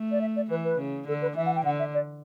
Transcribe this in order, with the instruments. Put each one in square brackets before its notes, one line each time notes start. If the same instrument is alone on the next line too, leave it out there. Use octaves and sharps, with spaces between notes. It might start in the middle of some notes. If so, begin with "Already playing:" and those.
Already playing: [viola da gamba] A3
[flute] D5
E5
D5
[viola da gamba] E3 [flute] B4
[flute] B4
[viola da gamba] C#3
[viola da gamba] D3 [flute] A4
[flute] B4
[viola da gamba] E3 [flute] E5
[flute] F#5
G5
[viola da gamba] D3 [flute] F#5
[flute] E5
D5